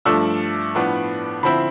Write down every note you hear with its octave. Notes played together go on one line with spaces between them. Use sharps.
G2 F3 A3 D4 E6
A2 F3 B3 D4
D3 F3 C4 E4 B5